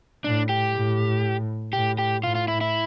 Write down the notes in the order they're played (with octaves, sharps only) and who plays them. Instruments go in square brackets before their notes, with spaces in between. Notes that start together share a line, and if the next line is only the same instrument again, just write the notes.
[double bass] A2 [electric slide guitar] D4
[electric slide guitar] G4
[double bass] A2
[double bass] A2 [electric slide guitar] G4
[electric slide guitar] G4
[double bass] A2 [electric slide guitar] F4
[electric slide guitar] F4
E4
E4